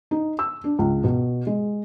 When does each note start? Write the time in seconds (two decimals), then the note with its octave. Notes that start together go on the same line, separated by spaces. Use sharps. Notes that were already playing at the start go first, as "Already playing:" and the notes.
0.11 D#4
0.39 E6
0.64 D4
0.79 C#2
1.04 B2
1.47 G#3